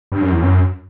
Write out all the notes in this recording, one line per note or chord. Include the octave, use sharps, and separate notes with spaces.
G2
F#2
E2
F#2